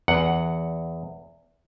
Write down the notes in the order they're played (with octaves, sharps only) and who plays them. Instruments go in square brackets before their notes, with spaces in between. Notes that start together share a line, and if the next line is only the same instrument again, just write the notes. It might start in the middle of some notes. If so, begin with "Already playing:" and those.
[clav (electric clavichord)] E2 F#5